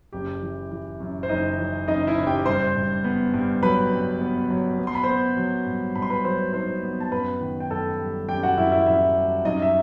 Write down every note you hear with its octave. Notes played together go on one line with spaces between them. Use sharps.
F#1 G4
E3
E3
F#2
C5
F#1 D#4 D#5
E3
F#1 D#4 D#5
E4 E5
F#1
G4 G5
G2 C5 C6
G2
B3
G2
F#3 B4 B5
G2
B3
F#3
B3
C6
B5
B3 C5 C6
F#3
G2
G2 B5
C6
B4 B5
F#3 C5 C6
D#4 C5 C6
B3
A5
F#2 B4 B5
D#3
G5
F#2 A4 A5
G3
F#2 G4 G5
F#4 F#5
F#2 E4 E5
E4 E5
F#2 E4 E5
G3
F#2 D#4 D#5
E5